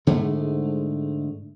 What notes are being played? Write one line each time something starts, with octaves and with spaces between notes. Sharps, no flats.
G#2 D3 G#3 A3